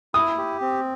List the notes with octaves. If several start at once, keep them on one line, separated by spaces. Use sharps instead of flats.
E4 D#6
G4
C4